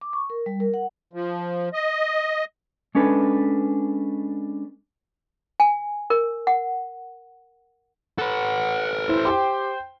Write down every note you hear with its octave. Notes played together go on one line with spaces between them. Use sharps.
D6
C#6
A#4
G3
A#4
F#5
F3
D#5
G#3 C#4 D4 A4 B4
G#5
A#4
F#5
A4 B4 F#5
E4 C5
G4 G5 C6